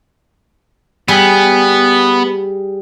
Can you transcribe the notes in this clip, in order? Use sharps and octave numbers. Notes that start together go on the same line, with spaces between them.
G3 B3 G#4